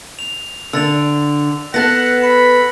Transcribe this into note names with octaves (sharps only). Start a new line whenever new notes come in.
F7
D3 E6 A6 F7
B3 A4 F#5 F#6 A6 A#6
B5 C#7